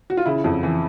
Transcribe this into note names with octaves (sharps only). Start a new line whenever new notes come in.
F#4
F4
C#3 E4
F2
E3